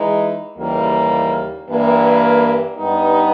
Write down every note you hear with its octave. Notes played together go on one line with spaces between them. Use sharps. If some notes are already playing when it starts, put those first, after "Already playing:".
Already playing: E3 G#3 D#4
D#2 C#3 E3 G3 A#3
G2 E3 A#3
G2 G3 B3 D#4